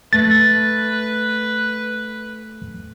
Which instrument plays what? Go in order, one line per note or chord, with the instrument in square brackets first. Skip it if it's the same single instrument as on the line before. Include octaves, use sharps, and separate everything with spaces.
[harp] A3 [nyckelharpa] B4 [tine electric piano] A6